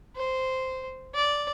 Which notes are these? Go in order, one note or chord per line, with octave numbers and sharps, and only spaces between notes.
C5
D5